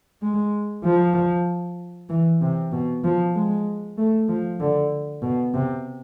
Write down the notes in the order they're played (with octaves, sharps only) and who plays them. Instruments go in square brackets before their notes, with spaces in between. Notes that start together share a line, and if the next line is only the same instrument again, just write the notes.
[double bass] G#3
F3
E3
C3
B2
F3
G#3
A3
F3
D3
B2
C3